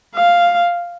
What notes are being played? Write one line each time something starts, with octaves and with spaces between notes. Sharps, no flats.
F5